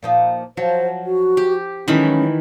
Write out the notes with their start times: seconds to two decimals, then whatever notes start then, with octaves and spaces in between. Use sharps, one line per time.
0.03 A#2 F3 D#4
0.57 F3 F#3 C5
1.05 F#4
1.37 G4
1.88 D#3 E3 F#3 G#3 A3 C#4 B5